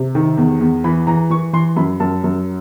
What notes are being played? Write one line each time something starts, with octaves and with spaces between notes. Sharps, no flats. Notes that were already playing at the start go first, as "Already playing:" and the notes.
Already playing: C3
D#3
E2
E2
E3 B5
E3 A#5
E3 C#6
E3 C6
F#2 B5
F#2 A5
F#2